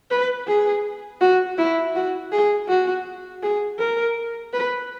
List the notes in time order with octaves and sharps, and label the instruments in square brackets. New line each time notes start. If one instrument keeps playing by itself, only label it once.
[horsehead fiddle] B4
G#4
F#4
E4
F#4
G#4
F#4
G#4
A#4
B4